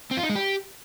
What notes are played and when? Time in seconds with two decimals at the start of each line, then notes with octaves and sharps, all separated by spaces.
0.11 C4
0.17 F4
0.23 D#4
0.29 G#3
0.35 G4